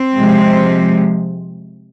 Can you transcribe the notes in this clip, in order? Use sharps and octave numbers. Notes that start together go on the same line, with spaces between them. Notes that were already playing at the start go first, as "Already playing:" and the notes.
Already playing: C4
C3 F3 G#3